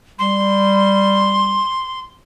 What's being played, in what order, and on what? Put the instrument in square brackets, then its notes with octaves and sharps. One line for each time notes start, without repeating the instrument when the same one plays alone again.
[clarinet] G3 [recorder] C6